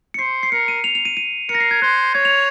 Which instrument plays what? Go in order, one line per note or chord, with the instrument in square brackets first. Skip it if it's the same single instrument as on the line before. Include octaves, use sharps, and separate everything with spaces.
[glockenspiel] C#7
[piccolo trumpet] C5 [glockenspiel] C7
[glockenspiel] C7
[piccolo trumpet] A#4 [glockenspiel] C#7
[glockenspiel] D#7
F7
F7
D#7
D#7
[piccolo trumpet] A#4 [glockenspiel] C#7
[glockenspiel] A#6
C7
G#6
[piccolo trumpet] C5 [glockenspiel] F#6
[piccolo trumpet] C#5 [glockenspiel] G#6
[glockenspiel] F7